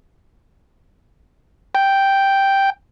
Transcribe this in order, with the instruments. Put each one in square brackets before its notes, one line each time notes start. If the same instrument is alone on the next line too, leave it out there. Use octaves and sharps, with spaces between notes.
[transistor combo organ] G5